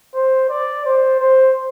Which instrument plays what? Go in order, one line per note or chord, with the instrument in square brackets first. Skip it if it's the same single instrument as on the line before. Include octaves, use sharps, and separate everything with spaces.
[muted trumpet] C5
D5
C5
C5